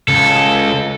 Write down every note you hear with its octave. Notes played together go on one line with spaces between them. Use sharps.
C#2 A4